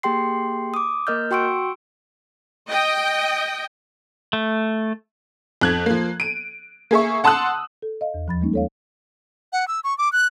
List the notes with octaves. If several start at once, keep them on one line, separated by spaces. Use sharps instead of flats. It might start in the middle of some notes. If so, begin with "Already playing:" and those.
A#3 G4 G#4 G5 C6 C7
D6 D#6
A#3 A#4 D#5 F6 G6
F#4 G5 C6 C#6 E6 D7
D#5 G5
A3
F2 F#6 G#6
F3 A#3
D7 D#7
A#3 G#4 E5 C#6
F#5 A5 C6 D#6 E6 F#6
A4
D#5 F5
E2
D#2 F3 B5 A6
G3 G#3 A#3 C#4 D#4
A4 C#5 F5
F#5
E6
C#6
D6
F#6